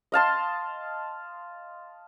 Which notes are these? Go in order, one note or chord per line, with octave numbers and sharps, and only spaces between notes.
D#5 F5 A5 C6